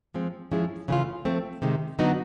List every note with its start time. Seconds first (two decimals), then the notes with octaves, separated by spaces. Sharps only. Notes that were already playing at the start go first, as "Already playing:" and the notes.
0.14 F3 G#3 C4
0.52 F3 G#3 C#4 E4 G#4
0.88 C#3 E3 A3 C#4 F4
1.25 F3 A3 C4
1.62 C3 D#3 G#3
1.99 D3 F#3 B3 D#4 F#4